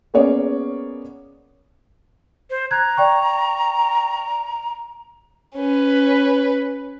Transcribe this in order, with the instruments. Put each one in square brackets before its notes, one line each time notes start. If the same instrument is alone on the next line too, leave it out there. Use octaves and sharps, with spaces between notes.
[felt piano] A#3 B3 C#4 G#4 C#5 D5
[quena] C5
[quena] A#5 [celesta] F#6 G#6
[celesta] D5 G5 C#6
[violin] C#4 B4